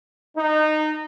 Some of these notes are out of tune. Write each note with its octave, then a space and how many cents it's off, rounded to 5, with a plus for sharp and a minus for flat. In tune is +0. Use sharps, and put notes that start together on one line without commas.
D#4 -20